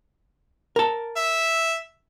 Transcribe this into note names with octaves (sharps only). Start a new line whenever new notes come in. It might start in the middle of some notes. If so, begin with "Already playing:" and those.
A#4 A5
E5